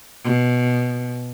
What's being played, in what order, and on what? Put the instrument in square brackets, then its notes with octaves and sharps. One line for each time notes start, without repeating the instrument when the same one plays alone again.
[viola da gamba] B2